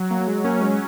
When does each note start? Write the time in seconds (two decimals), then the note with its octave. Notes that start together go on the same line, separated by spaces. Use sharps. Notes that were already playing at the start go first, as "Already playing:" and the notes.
Already playing: F#3
0.11 F#3 A#3
0.21 A#3
0.28 G#3
0.44 A#3 C#4
0.61 G#3